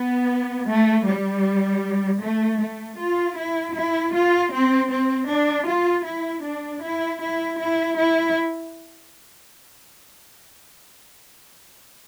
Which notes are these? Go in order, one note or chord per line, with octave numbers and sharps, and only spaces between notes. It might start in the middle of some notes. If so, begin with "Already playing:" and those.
Already playing: B3
A3
G3
A3
A3
F4
E4
E4
F4
C4
C4
D4
F4
E4
D4
E4
E4
E4
E4